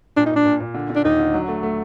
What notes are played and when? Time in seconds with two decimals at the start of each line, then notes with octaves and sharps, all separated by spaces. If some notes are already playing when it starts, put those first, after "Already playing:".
0.17 A#2 D4
0.26 D#4
0.31 A#2 D4
0.45 A#2
0.60 A#2
0.75 D3
0.90 D3
0.96 D4
1.05 D#2 D#4
1.19 D3
1.34 F#3
1.48 A3
1.63 A3